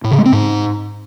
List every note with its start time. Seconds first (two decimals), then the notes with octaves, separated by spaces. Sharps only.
0.04 A2
0.11 C#3
0.18 G#3
0.25 C4
0.33 G#2